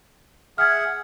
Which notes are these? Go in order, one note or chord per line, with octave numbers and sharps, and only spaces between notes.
G#4 E5 F#5 F6 G#6